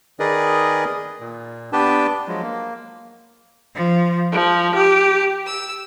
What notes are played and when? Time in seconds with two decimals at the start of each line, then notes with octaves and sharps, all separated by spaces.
0.20 D#3 G#4 A#4 B4 D5 D#5
1.21 A#2
1.73 B3 D4 G4 B4 G5 A5
2.28 F3 F#3 G#3
2.43 A#3
3.75 F3
4.32 F3
4.75 G4
5.45 E6